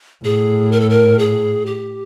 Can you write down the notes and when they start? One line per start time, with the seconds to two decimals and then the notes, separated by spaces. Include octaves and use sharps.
0.25 A2 G#4
0.72 A#4
0.80 A4
0.90 A#4
1.19 G#4
1.66 G4